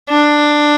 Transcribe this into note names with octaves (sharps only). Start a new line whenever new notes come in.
D4